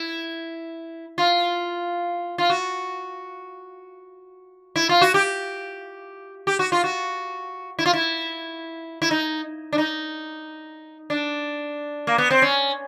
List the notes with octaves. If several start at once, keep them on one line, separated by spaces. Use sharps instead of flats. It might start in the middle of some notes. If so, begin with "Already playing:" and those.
Already playing: E4
F4
F4
F#4
E4
F4
F#4
G4
G4
F#4
F4
F#4
E4
F4
E4
E4
D#4
D4
D#4
D4
A#3
B3
C4
C#4